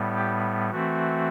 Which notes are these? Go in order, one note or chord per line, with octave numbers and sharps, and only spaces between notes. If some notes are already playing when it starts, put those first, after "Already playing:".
Already playing: A2 G3 B3
G4
E3 A3 C4 F#4